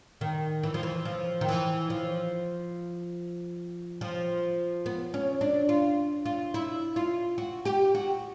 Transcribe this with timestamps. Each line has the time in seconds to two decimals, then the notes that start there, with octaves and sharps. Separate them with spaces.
0.21 D#3
0.63 E3
0.74 F3
0.83 E3
1.05 F3
1.41 D#3
1.48 E3
1.90 F3
4.01 F3
4.86 B3
5.14 C#4
5.41 D4
5.69 F4
6.25 F4
6.54 E4
6.96 F4
7.38 F#4
7.65 G4
7.95 F#4